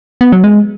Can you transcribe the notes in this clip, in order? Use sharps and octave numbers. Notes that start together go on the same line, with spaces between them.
B3
F#3
G#3